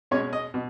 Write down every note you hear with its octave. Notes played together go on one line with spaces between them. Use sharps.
B2 G#3 C#4 C#5
D#5
B2